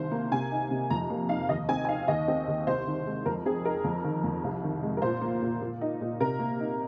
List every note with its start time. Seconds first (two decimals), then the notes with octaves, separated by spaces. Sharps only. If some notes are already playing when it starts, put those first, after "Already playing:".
Already playing: C2 D#3 C5
0.11 A#3
0.32 C3 G#5
0.51 D#4
0.71 C3
0.90 F2 A#5
1.10 A#3
1.29 D#4 F5
1.49 D#2 D#5
1.68 C4 G#5
1.85 G#5
1.88 D#4 F5
2.08 D#2 D#5
2.28 C4
2.48 D#2
2.67 C2 C5
2.87 D#3
3.06 G#3
3.26 F2 A#4
3.46 C4 G#4
3.65 D#4 A#4
3.84 F2
4.04 D#3
4.24 F2
4.44 C2
4.64 D#3
4.83 G#3
4.97 A#4
5.02 A#2 C5
5.21 A#3
5.42 A#2
5.61 A#2
5.81 D#4
6.01 A#2
6.20 C3 A#4
6.39 A#3
6.60 D#4